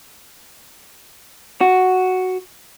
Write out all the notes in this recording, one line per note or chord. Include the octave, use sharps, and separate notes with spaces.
F#4